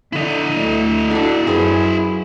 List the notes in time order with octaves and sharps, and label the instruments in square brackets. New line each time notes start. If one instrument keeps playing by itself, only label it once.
[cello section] D3 [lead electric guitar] E4 D#5
[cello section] D2
[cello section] D4 [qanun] F#4 A4
[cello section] F#2 [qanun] G#4 B4 C5